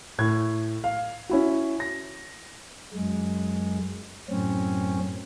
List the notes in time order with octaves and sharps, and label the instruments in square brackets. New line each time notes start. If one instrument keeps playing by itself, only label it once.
[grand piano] A2 G#6
F5
C#4 E4 F#4
A#6
[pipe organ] F#2 G#3
F#2 A2 C4 C#4